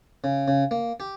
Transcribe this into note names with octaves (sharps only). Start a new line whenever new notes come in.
C#3
C#3
A#3
G4